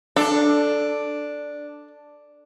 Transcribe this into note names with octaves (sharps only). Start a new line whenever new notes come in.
D4 A4